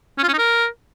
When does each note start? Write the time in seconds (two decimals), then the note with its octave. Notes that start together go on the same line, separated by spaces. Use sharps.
0.18 C#4
0.23 F4
0.28 C#4
0.33 D#4
0.38 A#4